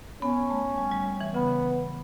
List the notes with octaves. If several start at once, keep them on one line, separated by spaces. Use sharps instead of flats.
B3 C#4
A3
G3
G3
G3
E3
C#3 B3